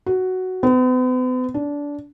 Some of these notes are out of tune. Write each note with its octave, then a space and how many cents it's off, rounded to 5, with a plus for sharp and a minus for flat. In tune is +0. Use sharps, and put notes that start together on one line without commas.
F#4 +5
B3 +45
D4 -20